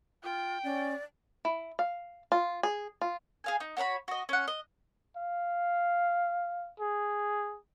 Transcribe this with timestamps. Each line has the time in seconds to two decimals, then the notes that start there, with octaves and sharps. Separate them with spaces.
0.23 F4 G5
0.64 C#4 D5
1.45 E4
1.79 F5
2.32 F4
2.63 G#4
3.02 F4
3.44 G#4 F5 G#5
3.60 D#4
3.77 F#4 C#5 F#5 B5
4.08 F#4 D#5
4.29 C#4 F#5
4.48 D#5
5.17 F5
6.80 G#4